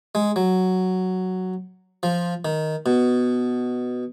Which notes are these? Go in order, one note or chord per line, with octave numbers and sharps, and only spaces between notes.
G#3
F#3
F3
D#3
B2